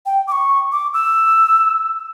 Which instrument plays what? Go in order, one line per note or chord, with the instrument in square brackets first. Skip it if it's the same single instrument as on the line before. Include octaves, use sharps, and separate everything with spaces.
[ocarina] G5
D6
C#6
D6
E6